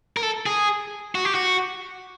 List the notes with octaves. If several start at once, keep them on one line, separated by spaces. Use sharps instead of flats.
A#4
A4
G#4
F#4
G4
F#4